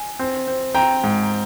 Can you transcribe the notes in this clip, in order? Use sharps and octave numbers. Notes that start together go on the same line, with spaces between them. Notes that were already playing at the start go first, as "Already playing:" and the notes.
Already playing: G#5
C4
C4
C4 G5 A#5
G#2